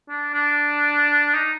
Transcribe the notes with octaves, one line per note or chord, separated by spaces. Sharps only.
D4
D4
D#4